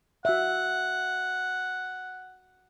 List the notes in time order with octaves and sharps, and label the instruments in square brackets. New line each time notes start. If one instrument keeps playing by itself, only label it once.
[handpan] F#4 E5 [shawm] F#5